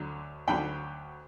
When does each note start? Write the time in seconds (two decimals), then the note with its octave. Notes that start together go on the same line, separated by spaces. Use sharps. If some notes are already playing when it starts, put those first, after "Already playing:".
Already playing: D2 D3 F#3
0.48 D2 D3 F#3 G5 B5